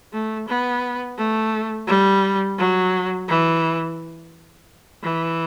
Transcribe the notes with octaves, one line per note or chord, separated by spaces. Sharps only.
A3
B3
A3
G3
F#3
E3
E3